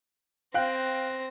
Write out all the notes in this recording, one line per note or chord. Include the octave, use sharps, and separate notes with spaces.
C4 F5 G5 F#6 A#6